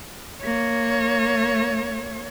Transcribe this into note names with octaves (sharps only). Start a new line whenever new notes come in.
A#3 C#5